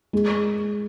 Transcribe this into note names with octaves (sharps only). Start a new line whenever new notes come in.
G#3